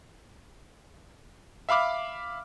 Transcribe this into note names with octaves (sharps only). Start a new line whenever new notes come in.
E5 F5 B5 D6 F6